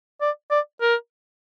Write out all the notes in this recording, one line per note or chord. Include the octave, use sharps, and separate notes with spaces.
D5
D5
A#4